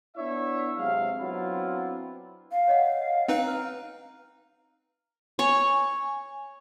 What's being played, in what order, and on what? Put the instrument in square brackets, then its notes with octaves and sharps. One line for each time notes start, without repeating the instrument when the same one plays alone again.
[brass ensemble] B3 D4 E4 C#5 E5
C3 F#3 G#3 F5
F#3 B3 C4 D4 E4 F4
[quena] F5
[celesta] C#5 D#5 F#5
[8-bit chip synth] C4 D#4 B4
[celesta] A#5 F6
[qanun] C#5 C#6 [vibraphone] G#5